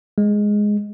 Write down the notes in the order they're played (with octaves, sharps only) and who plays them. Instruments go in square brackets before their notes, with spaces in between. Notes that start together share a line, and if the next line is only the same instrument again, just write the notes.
[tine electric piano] G#3